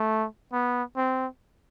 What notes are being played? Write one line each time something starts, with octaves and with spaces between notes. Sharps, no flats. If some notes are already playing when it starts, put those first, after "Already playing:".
Already playing: A3
B3
C4